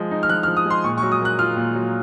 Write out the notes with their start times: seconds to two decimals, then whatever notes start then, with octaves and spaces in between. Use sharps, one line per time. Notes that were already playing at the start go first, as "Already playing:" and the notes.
Already playing: F3 G#3
0.11 D#4
0.23 F6
0.29 F3 F#6
0.43 F6
0.48 F3
0.57 D#6
0.66 G#3 C6
0.84 A#2 C#6
0.98 C#6
1.02 F#3
1.12 D#6
1.21 A#3 F#6
1.39 F4 F6
1.57 A#2
1.75 F#3